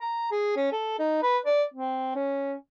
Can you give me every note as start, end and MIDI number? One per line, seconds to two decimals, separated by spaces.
0.01 0.27 82
0.31 0.54 68
0.56 0.71 61
0.72 0.99 69
0.99 1.21 63
1.23 1.38 71
1.46 1.63 74
1.74 2.13 60
2.15 2.54 61